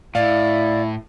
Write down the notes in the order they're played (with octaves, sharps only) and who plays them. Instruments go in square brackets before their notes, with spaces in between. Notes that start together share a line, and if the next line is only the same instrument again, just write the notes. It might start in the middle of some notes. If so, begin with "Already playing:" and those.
[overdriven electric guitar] A2 [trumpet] E4 [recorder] D5 [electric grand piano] F5